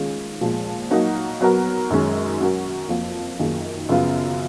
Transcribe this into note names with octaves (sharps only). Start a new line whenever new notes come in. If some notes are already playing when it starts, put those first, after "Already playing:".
Already playing: D#3 G#3 C#4 F4 G#4
A#2 F3 G#3
F#3 A#3 D#4 F#4 A#4
F#3 B3 F#4 A#4
F#2 D#3 G#3 C#4
F#3 C#4 F#4 A#4
F2 F3 A#3 F4
F#2 D#3 A#3 F4 G#4
F#2 C#3 F3 B3 F4